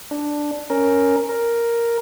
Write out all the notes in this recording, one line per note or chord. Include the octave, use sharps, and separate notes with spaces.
D4
C#4 A#4
A#4